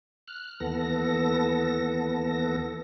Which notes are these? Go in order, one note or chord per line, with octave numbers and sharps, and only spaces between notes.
F6 F#6
D#2 E3 B3 A4 A#6